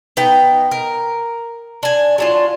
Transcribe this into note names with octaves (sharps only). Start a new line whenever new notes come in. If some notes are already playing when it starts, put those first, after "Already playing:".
B3 D#4 G5
A#4
D4 G#5
F#3 D4 F4